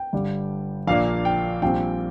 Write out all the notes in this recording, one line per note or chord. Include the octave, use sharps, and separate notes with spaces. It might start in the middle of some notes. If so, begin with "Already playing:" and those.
Already playing: G5
G1 G2 D3 G3 D4
A#1 A#2 A#3 D4 F5
G5
A#1 A#2 G3 C4 G5